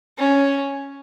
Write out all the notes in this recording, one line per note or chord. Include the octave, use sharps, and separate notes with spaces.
C#4